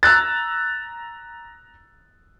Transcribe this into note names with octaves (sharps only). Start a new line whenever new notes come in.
A#5 E6 F#6 A6